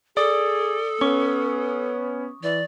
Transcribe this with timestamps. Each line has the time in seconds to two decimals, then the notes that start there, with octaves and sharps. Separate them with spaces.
0.17 G#4 A4 D5 D#6
1.01 B3 C#4 C#6 D6
2.43 E3 D5